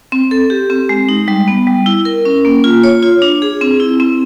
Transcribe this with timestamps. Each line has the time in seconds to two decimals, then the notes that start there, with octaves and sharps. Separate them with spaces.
0.12 C4
0.31 A4
0.50 G4
0.70 C4
0.89 G#3
1.09 D#4
1.28 G3
1.48 B3
1.67 G3
1.86 E4
2.05 A#4
2.25 C#4
2.45 A#3
2.64 F4
2.83 C#5
3.02 F4
3.22 D4
3.42 G#4
3.61 C4
3.80 E4
4.00 C4